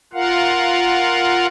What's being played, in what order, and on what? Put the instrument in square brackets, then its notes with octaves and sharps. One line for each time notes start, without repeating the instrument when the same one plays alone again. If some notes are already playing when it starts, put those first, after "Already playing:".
[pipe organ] F4 A#4 F5 F#5